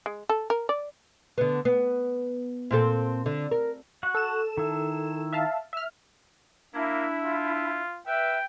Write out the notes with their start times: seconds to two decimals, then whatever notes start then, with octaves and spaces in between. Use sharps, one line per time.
0.06 G#3
0.29 A4
0.50 A#4
0.69 D5
1.38 D3 B3
1.65 B3
2.71 A#2 C4 A4
3.26 D3
3.51 A#4
4.03 F#4 F#5
4.15 A4 E7
4.57 D#3 E4
5.33 E5 F5 A5
5.73 E5 F6
6.75 A#3 D4 E4
7.25 F4
8.07 B4 E5 G5